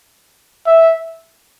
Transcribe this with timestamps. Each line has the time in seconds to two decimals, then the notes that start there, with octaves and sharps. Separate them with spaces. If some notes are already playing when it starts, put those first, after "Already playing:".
0.67 E5